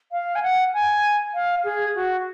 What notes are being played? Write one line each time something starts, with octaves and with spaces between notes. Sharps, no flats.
F5
G#5
F#5
G#5
F5
G#4
F#4